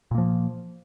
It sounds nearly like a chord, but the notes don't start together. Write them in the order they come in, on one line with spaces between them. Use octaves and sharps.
A#2 A#3 F3